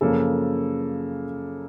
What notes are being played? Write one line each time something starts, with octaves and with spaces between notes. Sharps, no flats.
F#2 C#3 F3 A#3 A4